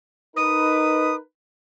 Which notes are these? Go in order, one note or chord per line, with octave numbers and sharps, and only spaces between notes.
D#4 A#4 B4 D#6